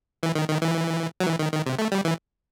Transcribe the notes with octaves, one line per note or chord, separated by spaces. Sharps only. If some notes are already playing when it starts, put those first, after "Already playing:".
E3
D#3
D#3
E3
F#3
E3
D#3
D#3
C3
A3
G3
E3